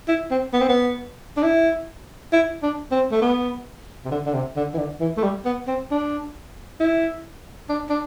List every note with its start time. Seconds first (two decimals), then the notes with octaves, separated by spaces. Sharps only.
0.08 E4
0.31 C4
0.53 B3
0.61 C4
0.69 B3
1.37 D4
1.43 E4
2.33 E4
2.63 D4
2.92 C4
3.12 A3
3.22 B3
4.05 C3
4.11 D3
4.26 D3
4.33 C3
4.56 D3
4.74 E3
4.78 D3
5.00 E3
5.17 A3
5.23 G3
5.45 B3
5.68 C4
5.91 D4
6.80 E4
7.69 D4
7.89 D4